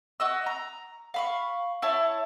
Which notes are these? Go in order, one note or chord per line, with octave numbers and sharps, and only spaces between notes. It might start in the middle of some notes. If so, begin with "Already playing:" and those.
F#4 D#5 E6
A#5
F5 B5 C#6
E4 C#5 A5